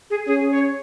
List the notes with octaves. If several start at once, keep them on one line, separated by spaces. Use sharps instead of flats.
G#4
C#4 G#4
C#5